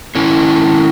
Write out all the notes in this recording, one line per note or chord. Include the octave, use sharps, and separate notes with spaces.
D#3 C#4 E4 C#5